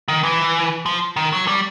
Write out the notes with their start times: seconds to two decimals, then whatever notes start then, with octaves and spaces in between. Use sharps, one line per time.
0.08 D#3
0.23 E3
0.86 F3
1.16 D#3
1.33 F#3
1.47 G3